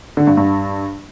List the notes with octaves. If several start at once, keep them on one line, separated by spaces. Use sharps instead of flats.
D3
G2
G2